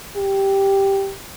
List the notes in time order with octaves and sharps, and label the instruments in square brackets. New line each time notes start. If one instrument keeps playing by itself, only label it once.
[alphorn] G4